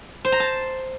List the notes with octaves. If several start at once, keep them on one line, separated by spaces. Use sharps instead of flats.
C5
A#5
A5